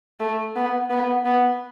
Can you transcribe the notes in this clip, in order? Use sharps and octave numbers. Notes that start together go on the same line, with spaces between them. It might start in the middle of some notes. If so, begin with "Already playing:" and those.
A3
B3
B3
B3